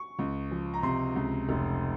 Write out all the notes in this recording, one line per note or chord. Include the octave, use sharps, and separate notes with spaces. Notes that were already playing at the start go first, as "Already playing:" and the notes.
Already playing: C#6
C#2
F3
A#5
C3 C6
C#2
F1